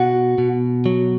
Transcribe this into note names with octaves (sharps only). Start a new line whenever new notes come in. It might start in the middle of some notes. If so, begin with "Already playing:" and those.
Already playing: B2 F#4 F#5
B2
F#3